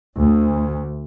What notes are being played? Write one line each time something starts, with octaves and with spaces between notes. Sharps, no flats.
D2